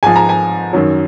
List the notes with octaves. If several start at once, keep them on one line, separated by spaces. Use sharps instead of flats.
G#2 F3 G#5
A#5
G#5
F#2 D#3 F#3